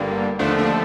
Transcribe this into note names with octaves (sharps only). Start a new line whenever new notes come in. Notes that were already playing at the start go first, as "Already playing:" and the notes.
Already playing: G1 G2 D3 G3 A#3
D#2 D3 F3 A3 D4
D4